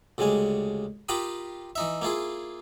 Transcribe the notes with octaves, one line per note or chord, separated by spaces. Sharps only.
D2 C#3 G3 G#3 G#5
F4 G4 A#4 G5 B5 D#6
E3 D#4 E5
A#3 E4 F4 G#4